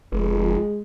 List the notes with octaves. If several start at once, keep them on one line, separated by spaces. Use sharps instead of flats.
F1 G#3